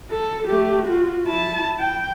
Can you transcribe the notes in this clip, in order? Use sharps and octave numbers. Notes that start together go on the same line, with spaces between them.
A4
A3 G4
F4 F#4
E4 A5
G5